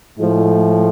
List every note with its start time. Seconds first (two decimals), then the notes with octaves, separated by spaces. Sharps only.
0.18 A2 F3 G#3